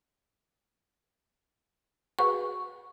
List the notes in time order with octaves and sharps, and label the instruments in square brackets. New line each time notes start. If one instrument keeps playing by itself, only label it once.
[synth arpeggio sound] F#4 G#4 B4 [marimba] C#6